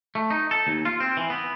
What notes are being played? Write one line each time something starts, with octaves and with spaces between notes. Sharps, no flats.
A3
D#4
A4
D#2
F4
C4
E3
B3